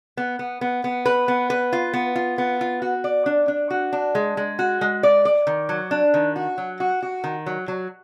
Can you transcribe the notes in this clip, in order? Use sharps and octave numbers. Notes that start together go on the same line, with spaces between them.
B3
B3
B3
B3
B4
B3
B4
F4
B3
F4
B3
F4
F#4
D5
D4
D4
F#4
D4
G#3
G#3
F#4
G#3
D5
D5
D#3
F#3
D4
D#3
F#4
F#3
F#4
F#4
D#3
F#3
F#3